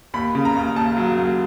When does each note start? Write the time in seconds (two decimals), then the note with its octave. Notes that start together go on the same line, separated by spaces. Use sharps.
0.14 D#2 B5
0.35 C#3
0.45 A#5
0.55 D#2
0.76 D#2 A5
0.97 F#3
1.18 D#2